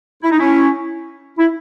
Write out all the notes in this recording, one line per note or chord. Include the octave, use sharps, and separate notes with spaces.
E4
D#4
C#4 E4
E4